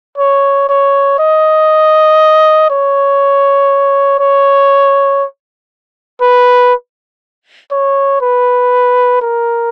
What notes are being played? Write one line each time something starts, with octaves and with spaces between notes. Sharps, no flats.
C#5
C#5
D#5
C#5
C#5
B4
C#5
B4
A#4